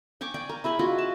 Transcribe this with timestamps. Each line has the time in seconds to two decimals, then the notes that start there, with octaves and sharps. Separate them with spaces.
0.21 G5 G#5 C#6 D6
0.34 D5 G5 G#5
0.49 A#4
0.64 E4 G#4 G#5 B5
0.79 F4 F#4 D#5
0.98 A5